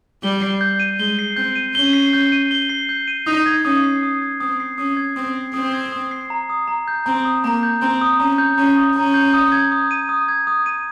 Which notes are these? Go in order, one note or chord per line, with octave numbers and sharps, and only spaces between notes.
G3 G7
C7
G6
D#7
G#3 G7
C7
C4 G6
D#7
C#4 G7
C7
G6
D#7
G7
C7
G6
D#7
D#4 D#6
G#6
C#4 D#6
C7
D#6
G#6
C4 D#6
C7
C#4 D#6
G#6
C4 D#6
C7
C4 D#6
G#6
D#6
C7
A#5
D#6
A#5
G6
C4 A#5
D#6
A#3 A#5
G6
C4 A#5
D#6
C#4 A#5
G6
C#4 A#5
D#6
C#4 A#5
G6
D#6
G#6
D#6
D#7
D#6
G#6
D#6
D#7